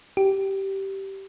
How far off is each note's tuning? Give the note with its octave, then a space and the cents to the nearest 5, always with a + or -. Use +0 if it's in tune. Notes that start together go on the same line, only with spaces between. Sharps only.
G4 -15